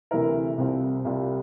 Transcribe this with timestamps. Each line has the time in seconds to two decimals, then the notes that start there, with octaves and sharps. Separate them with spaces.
0.11 D2 C3 E3 A3 E4 A#4
0.58 C2 C3 G3 C4 F4
1.04 C2 C3 G3 C4 F4